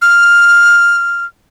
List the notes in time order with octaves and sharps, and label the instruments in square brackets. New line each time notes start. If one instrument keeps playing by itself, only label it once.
[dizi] F6